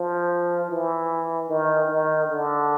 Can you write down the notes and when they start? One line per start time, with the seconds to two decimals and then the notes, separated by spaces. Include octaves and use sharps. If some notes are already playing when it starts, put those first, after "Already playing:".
Already playing: F3
0.69 E3
1.50 D#3
1.89 D#3
2.29 D3